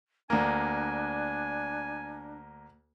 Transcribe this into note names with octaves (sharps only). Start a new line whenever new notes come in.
D2 A#3 D4 G#5